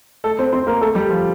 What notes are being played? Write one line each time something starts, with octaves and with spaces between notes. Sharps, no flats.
A3 A4
C4 C5
C4 C5
A#3 A#4
A3 A4
G3 G4
F3 F4